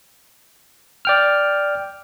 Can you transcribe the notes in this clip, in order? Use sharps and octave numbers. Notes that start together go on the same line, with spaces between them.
D5 G5 F6